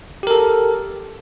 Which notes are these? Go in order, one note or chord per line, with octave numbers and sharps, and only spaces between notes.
G4 A4 A#4